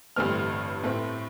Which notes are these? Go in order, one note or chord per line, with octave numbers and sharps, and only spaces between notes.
A1 G2 D3 A3 C4 F6
A2 A3 C4